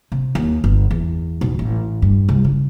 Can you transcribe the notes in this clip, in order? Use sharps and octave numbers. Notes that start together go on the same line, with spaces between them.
C3
D#2
G1
E2
B1
A1
G2
C2
C#3